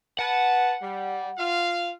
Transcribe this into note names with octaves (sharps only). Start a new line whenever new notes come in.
B4 F#5 A5
G3
F4 F5